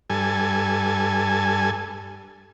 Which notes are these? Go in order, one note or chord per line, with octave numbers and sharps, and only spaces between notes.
G2 A4 G#5